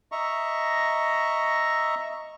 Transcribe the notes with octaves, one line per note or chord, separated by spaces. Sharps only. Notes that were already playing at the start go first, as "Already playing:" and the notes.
D#5 E5 A#5 C#6